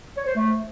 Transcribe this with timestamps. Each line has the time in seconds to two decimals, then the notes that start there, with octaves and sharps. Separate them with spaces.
0.17 C#5
0.26 C5
0.35 A3